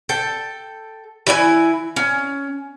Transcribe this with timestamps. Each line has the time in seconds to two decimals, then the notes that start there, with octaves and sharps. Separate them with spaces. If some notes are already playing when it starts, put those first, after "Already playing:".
0.09 A4 G5
1.27 E3 E4 C#5 G#5
1.96 C#4